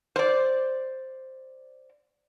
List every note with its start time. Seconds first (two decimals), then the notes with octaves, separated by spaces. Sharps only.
0.16 C5 D5